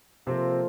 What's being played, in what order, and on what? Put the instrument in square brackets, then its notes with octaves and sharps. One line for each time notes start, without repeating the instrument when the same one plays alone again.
[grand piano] C3 C4 [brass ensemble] F3 A#3 F4 A4 C5